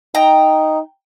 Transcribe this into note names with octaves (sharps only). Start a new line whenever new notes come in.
D#4 G5 A#5